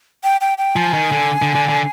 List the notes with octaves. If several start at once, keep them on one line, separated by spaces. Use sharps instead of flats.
G5
G5
G5
F3 G#5
D#3
D3
D3
D3
D3